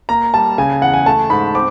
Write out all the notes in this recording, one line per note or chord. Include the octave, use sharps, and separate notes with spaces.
A#3 A#5
G3 A5
C#3 G#5
E2 F#5
G#5
A3 A5
G#2 B5
C4 D6